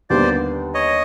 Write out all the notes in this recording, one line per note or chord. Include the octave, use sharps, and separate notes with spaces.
D#2 D3 G3 B3 C5 D5
C#5 D#5